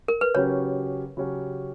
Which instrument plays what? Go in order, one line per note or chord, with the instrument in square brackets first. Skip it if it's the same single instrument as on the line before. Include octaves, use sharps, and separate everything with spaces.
[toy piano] A#4
B4
[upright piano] C#3 F#3 C#4 G4 [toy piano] C#5
[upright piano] C#3 F#3 C#4 G4